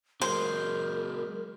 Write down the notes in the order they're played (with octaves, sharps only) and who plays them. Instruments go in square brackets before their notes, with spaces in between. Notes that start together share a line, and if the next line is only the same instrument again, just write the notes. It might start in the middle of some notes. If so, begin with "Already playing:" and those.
[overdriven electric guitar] F#3 G#3 [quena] A#4 [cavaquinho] C5